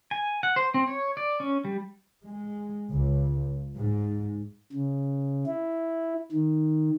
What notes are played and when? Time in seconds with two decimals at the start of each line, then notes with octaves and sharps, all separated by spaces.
0.11 G#5
0.43 F#5
0.56 C5
0.74 C4
0.87 C#5
1.17 D5
1.40 C#4
1.65 G3
2.25 G#3
2.89 C#2
3.76 G#2
4.72 C#3
5.46 E4
6.32 D#3